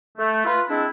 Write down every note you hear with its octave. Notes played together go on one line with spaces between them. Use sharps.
A3
F4 B4
G#3 C4 D4 E4